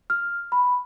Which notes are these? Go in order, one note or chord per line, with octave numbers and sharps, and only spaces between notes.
F6
B5